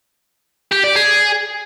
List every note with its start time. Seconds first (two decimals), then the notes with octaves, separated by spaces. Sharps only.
0.72 G4
0.84 D5
0.96 G#4